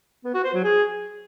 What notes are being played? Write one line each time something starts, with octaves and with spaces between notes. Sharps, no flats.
B3
F#4
C5
F#3
G#4